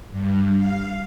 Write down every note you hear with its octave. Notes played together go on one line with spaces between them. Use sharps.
G2
F5